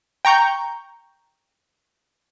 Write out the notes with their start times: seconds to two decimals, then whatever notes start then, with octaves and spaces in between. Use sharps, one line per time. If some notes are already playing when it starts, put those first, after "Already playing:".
0.25 G5 A#5 C#6 G6